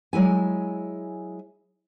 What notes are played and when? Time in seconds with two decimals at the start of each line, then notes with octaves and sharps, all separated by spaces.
0.13 F#3 G#3 E4 G#5